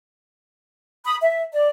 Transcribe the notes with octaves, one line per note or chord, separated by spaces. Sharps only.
B5 D#6
E5
D5